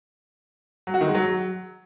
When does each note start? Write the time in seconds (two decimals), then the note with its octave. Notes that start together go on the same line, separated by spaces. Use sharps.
0.87 F#3
0.94 F#4
1.01 D#3
1.08 G#3
1.15 F#3